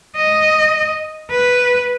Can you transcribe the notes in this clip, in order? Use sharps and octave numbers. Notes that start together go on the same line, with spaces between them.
D#5
B4